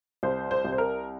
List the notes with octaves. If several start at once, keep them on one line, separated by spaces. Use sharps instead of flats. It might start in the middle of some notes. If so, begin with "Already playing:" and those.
C2 C5
C5
C2
C5
A#4